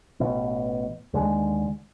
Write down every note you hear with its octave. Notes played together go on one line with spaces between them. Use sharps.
A1 B2
D#2 D3 G#3